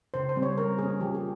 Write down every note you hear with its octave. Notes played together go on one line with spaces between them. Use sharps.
C#3 C5
C5
G3 C4
C#5
G3 A#4
A#3 C#4 G#4
F3 G4
G#4